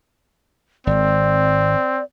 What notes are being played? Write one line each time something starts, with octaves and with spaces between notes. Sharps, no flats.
G#1 C4 D5